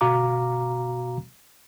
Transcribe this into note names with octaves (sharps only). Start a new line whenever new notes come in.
G1 B2 F#4 F5 A#5 D6